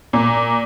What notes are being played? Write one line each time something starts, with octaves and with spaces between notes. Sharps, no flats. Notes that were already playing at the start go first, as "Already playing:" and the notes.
A#2